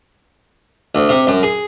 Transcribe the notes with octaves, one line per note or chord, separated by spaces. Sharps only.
D2
C3
F#2
G#4